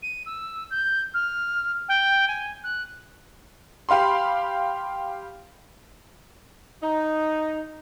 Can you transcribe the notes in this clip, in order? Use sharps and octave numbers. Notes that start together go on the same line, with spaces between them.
D#7
E6
G6
F6
G5
G#5
F#6
G4 F5 B5 C6
D#4